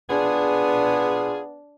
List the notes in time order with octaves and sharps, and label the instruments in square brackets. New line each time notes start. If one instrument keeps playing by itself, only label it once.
[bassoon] B3 [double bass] D4 [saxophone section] F4 G#4